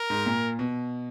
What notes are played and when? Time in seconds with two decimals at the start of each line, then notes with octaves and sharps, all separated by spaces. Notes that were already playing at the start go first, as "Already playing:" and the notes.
Already playing: A#4
0.10 G#2
0.26 A#2
0.59 B2